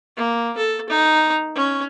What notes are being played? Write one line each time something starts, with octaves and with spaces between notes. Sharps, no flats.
A#3
A4
D#4
C#4